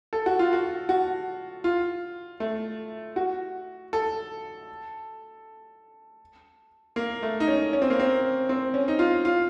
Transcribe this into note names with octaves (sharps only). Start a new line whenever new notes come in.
A4
F#4
F4
F#4
F#4
F4
A3
F#4
A4
A#3
A3
D#4
C#4
C#4
C4
A#3
C4
C4
C#4
D#4
F4
F4